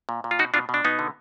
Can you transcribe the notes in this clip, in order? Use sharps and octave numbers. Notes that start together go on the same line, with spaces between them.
A#2
A#2
F4
B2 D#4 F#4
B2 D4 F4
B2
D4
B2 B3 D#4
D3